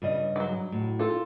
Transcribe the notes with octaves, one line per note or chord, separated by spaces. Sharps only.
G2 C#3 D#5
E3 F#3
A2
F4 A4